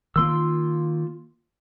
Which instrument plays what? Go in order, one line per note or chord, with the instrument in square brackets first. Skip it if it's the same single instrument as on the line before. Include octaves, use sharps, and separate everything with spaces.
[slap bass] D#3 A#3 [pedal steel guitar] F4 C6 E6